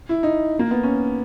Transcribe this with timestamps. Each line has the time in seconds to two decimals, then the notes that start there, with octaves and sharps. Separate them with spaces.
0.09 E4
0.23 D#4
0.59 A#3
0.71 B3
0.83 C#4